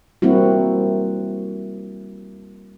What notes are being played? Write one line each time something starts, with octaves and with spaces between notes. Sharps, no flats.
G3 A#3 C4 E4 F#4